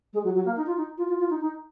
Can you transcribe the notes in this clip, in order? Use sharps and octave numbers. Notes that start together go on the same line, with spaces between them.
G#3
F#3
F#3
A#3
D#4
F4
D#4
F4
F4
F4
D#4
D#4